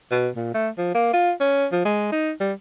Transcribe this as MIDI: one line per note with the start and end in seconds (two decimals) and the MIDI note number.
0.11 0.29 47
0.36 0.49 46
0.54 0.69 57
0.78 0.90 53
0.95 1.11 58
1.13 1.32 65
1.40 1.66 61
1.72 1.84 53
1.85 2.10 56
2.12 2.31 63
2.40 2.53 55